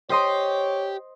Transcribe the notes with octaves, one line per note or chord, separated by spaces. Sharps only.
G4 C5 C#5 D#5 C6